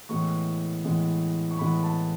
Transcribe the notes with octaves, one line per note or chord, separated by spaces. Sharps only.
A2 E3 G#3 B3 C#6
A2 E3 G#3 B3
C#6
A2 E3 G#3 B3 B5
A5